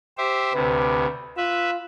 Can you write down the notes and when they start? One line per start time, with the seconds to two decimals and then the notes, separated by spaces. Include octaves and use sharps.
0.18 G4 C5 E5
0.54 D2 C3 B4
1.37 F4 B4 E5